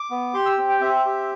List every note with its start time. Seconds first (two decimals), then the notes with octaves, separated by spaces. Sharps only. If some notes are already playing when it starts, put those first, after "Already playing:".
Already playing: D6
0.10 B3
0.34 G4 C6
0.46 E6
0.57 C4
0.69 G5
0.81 C4 E5
1.05 G4